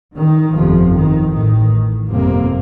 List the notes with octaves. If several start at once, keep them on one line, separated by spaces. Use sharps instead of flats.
D#3
G1 F2 C3 F3
D#3
A1 A2 D#3
G1 F2 C3 A#3